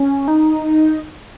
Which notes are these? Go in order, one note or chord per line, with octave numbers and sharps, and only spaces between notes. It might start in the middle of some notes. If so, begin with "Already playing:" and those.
Already playing: C#4
D#4